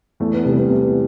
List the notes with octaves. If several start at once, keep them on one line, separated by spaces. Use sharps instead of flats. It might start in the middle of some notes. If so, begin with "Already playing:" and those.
E2 A3
B3
C3 G3 B3
B3
E2